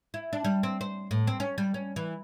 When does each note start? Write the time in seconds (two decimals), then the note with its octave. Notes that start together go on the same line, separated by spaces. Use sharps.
0.14 E4
0.33 D4
0.45 G3
0.63 C4
0.81 C5
1.11 A2
1.27 C4
1.40 C#4
1.58 G3
1.74 C#4
1.96 E3